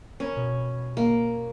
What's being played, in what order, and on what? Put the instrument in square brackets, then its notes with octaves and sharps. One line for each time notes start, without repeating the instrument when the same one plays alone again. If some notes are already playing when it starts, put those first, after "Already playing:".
[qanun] C#4 [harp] A#4 C#5 B5
[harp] B2
[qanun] A#3